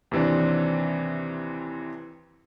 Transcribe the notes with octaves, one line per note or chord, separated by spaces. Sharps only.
D#2 C3 E3 C4 D4